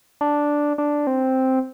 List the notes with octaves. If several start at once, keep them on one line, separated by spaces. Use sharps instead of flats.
D4
D4
C4